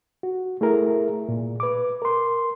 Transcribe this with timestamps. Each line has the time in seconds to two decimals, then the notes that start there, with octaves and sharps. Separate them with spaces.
0.23 F#4
0.61 A3 E4 G#4 A#4
1.29 A#2
1.60 B4 D6
2.02 A#4 C6